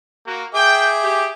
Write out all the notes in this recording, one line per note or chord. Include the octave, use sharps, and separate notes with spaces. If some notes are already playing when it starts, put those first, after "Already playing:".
A#3 F#4
G#4 E5 G5 D6
G4